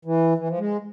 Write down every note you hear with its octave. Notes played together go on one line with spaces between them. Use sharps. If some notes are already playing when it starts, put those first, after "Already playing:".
E3
E3
F3
G#3